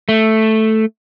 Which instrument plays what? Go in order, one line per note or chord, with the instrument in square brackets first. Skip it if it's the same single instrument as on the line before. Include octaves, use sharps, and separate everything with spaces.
[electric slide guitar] A3